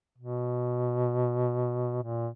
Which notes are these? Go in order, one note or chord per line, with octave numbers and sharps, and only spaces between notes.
B2
A#2